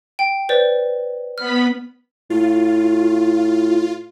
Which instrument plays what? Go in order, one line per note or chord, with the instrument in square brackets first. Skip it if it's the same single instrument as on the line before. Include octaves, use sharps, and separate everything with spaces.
[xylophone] G5
B4 C5 D5
[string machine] B3 B5 B6 [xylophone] F6
[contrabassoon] A2 [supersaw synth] F4